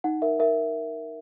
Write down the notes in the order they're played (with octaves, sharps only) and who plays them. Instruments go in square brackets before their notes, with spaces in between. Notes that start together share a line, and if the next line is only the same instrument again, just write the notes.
[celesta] D#4 F#5
A#4 E5
A#4 E5